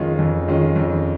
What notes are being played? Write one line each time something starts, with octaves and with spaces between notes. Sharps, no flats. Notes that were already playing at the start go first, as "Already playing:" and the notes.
Already playing: F2 D#3 G#3 C#4 F4
F2
D#3 G#3 C#4 F4
F2